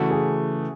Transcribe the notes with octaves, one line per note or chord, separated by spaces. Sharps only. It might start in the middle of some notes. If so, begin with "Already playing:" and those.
Already playing: C#3 E3 A3 F#4
G#4